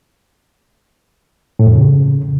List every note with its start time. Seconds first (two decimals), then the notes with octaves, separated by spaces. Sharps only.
1.59 A2
1.67 F2
1.75 C#3